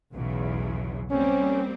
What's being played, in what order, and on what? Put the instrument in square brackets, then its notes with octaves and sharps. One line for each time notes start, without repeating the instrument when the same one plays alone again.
[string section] B1 E2 C#3
[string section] G3 A#3 C4 [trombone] C#4